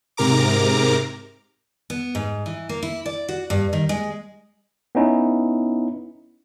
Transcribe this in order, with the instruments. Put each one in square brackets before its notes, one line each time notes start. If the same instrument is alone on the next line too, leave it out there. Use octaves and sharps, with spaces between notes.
[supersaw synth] G#2 C3 A#4 A#5 D6
[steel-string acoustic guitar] B3
G#2
E3
A#3
E4
D5
F#4
G2
D#3
G#3
[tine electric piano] B3 C#4 D#4 E4